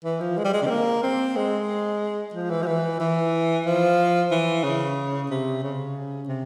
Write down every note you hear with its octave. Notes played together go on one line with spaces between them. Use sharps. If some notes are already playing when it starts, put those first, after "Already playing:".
E3
F3
G#3
G3
G#3
C#3
C4
A#3
C4
G#3
F3
E3
F3
E3
E3
F3
E3
C#3
C3
C#3
C3